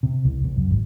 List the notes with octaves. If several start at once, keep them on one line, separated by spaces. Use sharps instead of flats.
C3
C2
C2
F#2
G#1